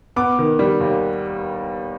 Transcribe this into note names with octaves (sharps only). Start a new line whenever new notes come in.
B3 D6
D#3
G3
D#2